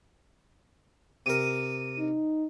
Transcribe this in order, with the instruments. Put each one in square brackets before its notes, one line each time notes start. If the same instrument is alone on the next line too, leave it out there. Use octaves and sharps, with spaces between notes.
[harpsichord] C3 A#4 [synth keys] D#7
[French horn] D#4